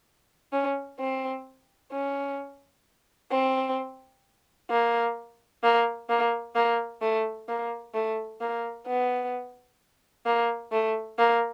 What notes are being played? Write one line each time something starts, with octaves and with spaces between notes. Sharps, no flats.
C#4
C4
C#4
C4
A#3
A#3
A#3
A#3
A3
A#3
A3
A#3
B3
A#3
A3
A#3